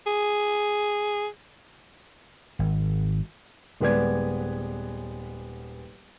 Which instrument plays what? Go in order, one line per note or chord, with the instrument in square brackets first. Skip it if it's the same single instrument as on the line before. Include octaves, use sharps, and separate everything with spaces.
[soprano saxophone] G#4
[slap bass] G#1
[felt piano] D#1 G#3 B3 B4 D5 G#6